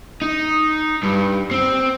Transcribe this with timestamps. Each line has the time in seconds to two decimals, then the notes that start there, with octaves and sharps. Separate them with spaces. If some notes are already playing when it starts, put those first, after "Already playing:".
0.22 D#4
1.03 G2
1.51 C4